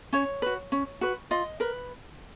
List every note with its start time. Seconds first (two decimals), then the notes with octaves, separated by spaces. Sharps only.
0.13 C#4 C#5
0.42 F#4 B4
0.72 C#4
1.01 F#4 B4
1.31 F4 D#5
1.60 A#4 B4